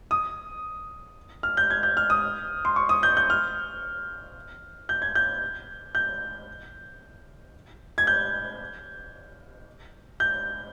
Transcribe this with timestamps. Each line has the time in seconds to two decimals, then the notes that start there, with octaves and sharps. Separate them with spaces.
0.11 D#6
1.43 F6
1.57 G6
1.70 G#6
1.83 G6
1.97 F6
2.10 D#6
2.65 C6
2.76 C#6
2.89 D#6
3.03 G6
3.17 G6
3.30 F6
4.89 G6
5.02 G#6
5.15 G6
5.95 G6
7.98 G#6
8.07 G6
10.20 G6